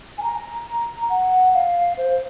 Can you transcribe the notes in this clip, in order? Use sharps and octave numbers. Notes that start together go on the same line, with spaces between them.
G#5
A#5
F#5
F5
C5